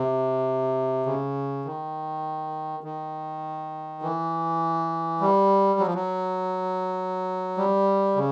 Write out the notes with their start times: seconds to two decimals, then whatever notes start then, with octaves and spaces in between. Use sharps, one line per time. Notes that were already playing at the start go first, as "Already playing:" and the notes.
Already playing: C3
1.06 C#3
1.65 D#3
2.83 D#3
4.02 E3
5.21 G3
5.80 F#3
5.87 F3
5.94 F#3
7.57 G3
8.16 C#3